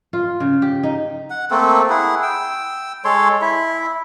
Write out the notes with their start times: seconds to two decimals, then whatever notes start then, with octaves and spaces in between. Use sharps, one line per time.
0.13 F4
0.40 C#3
0.62 G4
0.83 D#4
1.30 F#5
1.51 A3 A#3 C4 A4
1.90 E4 G#4 F#5
2.23 G5 E6
3.05 G#3 A4 C#5 C6
3.42 E4 E5